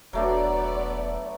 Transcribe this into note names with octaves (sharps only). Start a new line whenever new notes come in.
E1 F#3 A3 B3 D4 D5